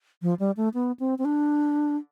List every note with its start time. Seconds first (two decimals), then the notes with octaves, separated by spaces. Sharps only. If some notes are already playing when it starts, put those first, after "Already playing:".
0.22 F3
0.39 G3
0.57 A3
0.74 B3
1.00 C4
1.19 C4
1.25 D4